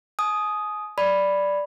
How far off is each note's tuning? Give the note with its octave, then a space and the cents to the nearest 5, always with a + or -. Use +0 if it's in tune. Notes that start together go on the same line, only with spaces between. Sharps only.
G#5 +35 D#6 +0
D5 +0 B5 +0